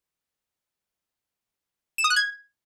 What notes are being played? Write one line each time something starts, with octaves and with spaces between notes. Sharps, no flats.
E7
D#6
F#6
G#6